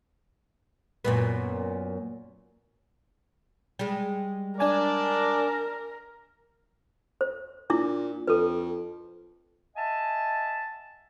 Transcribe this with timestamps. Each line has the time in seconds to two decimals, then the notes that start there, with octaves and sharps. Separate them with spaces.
1.05 F#2 A#2 B3
3.79 G3 G#3
4.60 D4 A#4 D5 G#5 A5
7.21 C5
7.70 A#2 D4 E4 D6
8.28 F2 A4 B4
9.76 D#5 E5 F#5 G#5 A5